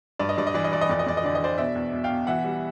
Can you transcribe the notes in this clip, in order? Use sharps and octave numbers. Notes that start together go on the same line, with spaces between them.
G2 D5
D#5
G2 D5
D#5
E3 D5
D#5
E3 D5
D#5
F2 D5
D#5
F2 D5
D#5
D3 D5
D#5
D3 C5 D5
B2 D5 E5
E2
B2
F5 G5
B2
E3 E5 F#5
G3